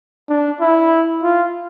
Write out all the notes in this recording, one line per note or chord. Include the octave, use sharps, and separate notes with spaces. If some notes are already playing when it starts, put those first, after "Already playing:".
D4
E4
F4